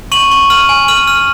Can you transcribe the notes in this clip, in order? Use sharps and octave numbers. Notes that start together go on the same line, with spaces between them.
C#6 D#7 F#7
C#6
F6 D#7 F#7
G#5
F6 D#7 F#7
F6